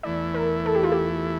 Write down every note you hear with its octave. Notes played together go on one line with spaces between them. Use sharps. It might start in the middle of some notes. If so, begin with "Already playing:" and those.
E2 E3 A3 E4 D5
A#4
A4
G4
F4
G4